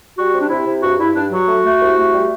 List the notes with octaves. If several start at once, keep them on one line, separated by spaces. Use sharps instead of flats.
G3 F#4
C3
D4
C3 E4
C3
G2 F#4
G2 E4
G2 D4
F#3 F#4
A3
A3
C2
A3
G3